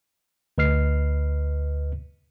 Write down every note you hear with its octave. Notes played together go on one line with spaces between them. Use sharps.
D2 B4 D#5 F6 C7